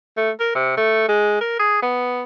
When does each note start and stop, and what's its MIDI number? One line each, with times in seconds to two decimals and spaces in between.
0.17 0.31 57
0.40 0.51 70
0.55 0.76 48
0.77 1.04 57
1.09 1.39 56
1.41 1.55 70
1.60 1.81 68
1.83 2.23 59